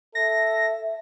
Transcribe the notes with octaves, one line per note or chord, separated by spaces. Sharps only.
A4 E5 A#6